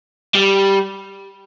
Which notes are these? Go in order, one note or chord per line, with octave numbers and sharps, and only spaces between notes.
G3